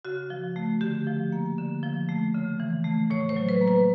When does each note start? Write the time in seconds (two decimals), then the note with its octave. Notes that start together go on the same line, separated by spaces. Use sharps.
0.05 C#3 F#4
0.30 F3
0.56 A3
0.81 D3 G4
1.07 F3
1.32 A#3
1.58 D3
1.83 F3
2.09 A3
2.34 C#3
2.60 E3
2.84 A3
3.10 A2 C#5
3.29 C5
3.36 F#3
3.49 B4
3.61 A#3
3.68 B4